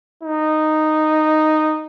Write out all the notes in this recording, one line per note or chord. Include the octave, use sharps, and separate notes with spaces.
D#4